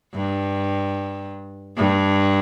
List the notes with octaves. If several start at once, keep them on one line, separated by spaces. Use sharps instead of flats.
G2
G2